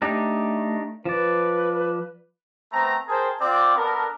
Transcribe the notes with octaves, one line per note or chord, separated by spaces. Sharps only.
A3 D4 D#4 G4
F3 B4 D5
A3 B3 C4 A#5
G#4 A#4 C5 G5 A5
C4 F4 D5
B3 D4 A4 A#4